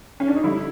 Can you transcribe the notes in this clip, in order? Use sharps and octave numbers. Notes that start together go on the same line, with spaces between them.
C#4
D4
D#4
D3 G3 E4